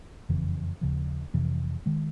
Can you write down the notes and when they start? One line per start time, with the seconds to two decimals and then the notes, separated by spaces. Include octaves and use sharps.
0.29 F#1 F2 C#3 E3
0.81 D#2 C#3 F3
1.34 F2 C3 E3
1.86 D#3 G#3